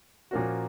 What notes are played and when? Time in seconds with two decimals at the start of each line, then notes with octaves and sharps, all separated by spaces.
0.31 A#2 F3 A#3 C#4 F#4